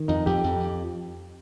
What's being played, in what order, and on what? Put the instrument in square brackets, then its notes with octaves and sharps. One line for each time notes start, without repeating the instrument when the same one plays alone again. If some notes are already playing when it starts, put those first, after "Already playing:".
Already playing: [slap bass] D#3
[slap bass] F2 [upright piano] D#4
[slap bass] F2 [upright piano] G4
[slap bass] F2